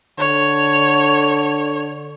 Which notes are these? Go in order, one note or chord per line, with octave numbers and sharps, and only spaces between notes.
D3 C#5